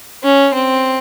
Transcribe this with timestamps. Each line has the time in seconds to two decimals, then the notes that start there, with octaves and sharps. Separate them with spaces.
0.24 C#4
0.54 C4